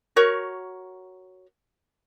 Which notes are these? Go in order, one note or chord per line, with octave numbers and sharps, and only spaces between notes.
F#4 A#4 C#5